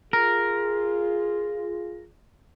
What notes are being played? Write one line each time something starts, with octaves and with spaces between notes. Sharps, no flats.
F4 G#4 A#4